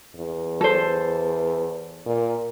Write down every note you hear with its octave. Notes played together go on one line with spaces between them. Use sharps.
E2
A4 C5
A#2